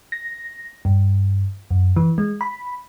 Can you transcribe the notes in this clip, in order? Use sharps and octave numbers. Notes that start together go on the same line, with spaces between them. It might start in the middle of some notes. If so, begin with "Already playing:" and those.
A#6
G2
F#2
E3
G#3
B5